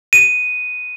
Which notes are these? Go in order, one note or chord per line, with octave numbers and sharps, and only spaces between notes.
D#7